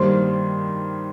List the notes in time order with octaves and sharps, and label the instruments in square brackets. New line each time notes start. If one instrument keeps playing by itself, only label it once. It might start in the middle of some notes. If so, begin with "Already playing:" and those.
Already playing: [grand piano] G2 D#3 G3 A#3 [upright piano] C5 C6